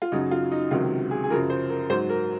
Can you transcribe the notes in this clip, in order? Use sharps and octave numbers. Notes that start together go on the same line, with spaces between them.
F4
F#2 C#3 F#3 D#4
F4
D#4
C#2 C3 D#3 F#3 F4
G#4
G#4
F#2 C#3 F3 A#4
C5
A#4
G#2 F#3 C5
A#4